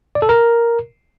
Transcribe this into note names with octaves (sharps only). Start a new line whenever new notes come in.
D5
A4
A#4